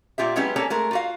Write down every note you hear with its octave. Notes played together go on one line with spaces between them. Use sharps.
A#2 F4 G4 E5
F#3 G#3 B3 C#4 E4 G4
A#3 C#4 A4 C#5 G#5 A5
G#3 A3 A#4
F4 F#4 F5